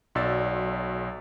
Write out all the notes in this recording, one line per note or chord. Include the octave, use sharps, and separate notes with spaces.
B1 F#3 D5 E6 A6